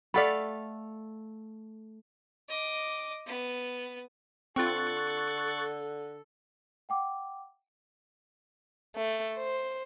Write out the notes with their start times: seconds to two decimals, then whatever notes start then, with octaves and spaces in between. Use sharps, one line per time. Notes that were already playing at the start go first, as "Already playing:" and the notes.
0.14 A3 A4 D5 F5 F#5 B5
2.49 D#5 D6
3.26 B3
4.56 D3 C4 F4 A4 C#6 F#6 A6
6.89 F#5 G5 D6
8.96 A3
9.37 C5